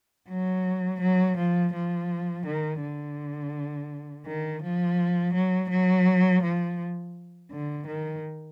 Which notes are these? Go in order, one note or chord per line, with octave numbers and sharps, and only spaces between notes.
F#3
F#3
F3
F3
D#3
D3
D#3
F3
F#3
F#3
F3
D3
D#3